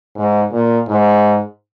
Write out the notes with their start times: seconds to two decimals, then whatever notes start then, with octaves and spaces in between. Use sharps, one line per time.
0.16 G#2
0.52 A#2
0.87 G#2